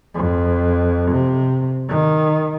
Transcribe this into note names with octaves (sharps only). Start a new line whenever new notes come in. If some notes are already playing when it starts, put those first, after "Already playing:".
F2
C3
D#3